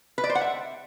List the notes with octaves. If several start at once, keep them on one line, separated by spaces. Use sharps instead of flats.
B4
D5
C5
F#5
E5